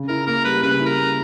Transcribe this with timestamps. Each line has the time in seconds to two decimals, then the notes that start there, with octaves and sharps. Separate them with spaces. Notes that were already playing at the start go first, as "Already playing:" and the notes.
Already playing: C#3
0.08 E4 A#4
0.27 A#3 A#4
0.45 G3 B4
0.63 C#3 B4
0.80 E4
0.86 A#4
0.99 A#3